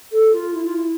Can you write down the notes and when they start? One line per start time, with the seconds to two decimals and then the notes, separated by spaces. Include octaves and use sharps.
0.12 A4
0.32 F4
0.54 E4
0.65 F4
0.76 E4